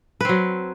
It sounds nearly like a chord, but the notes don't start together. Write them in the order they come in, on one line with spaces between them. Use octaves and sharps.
B4 C4 F#3